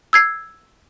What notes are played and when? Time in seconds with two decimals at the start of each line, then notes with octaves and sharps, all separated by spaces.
0.13 E6 G#6 C7